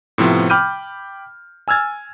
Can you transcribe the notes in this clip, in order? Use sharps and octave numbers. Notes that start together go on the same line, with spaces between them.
A2 C3 F3 B3
G5 B5 D6 F6 G6 D#7
G#5 E6 F6 G#6 A6